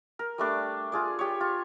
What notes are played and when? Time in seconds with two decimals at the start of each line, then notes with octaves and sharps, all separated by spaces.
0.19 A#4
0.38 G3 A3 D4 D6
0.92 F4 G#4 D5
1.19 G4 C#5
1.41 F4